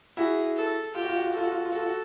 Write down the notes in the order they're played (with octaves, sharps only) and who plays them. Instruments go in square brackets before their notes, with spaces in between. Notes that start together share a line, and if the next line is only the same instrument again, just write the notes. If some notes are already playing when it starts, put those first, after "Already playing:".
[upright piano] E4 F#4 [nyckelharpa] G#4
[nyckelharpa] A4
[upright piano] F4 [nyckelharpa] G4
[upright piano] F#4
F4
F#4
F4
F#4
[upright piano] F4 [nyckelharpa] A4
[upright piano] F#4
F4
F#4
F4
[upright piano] F#4 [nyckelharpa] A4
[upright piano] F4
F#4